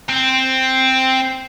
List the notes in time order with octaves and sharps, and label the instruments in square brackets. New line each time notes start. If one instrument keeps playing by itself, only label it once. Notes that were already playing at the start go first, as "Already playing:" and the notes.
[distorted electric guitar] C4